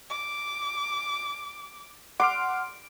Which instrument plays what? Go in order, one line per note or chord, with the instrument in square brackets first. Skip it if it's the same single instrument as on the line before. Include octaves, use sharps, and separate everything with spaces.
[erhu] D6
[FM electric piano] F#5 C6 F6 [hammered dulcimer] D6